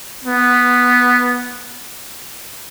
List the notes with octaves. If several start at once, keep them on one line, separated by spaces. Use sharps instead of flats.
B3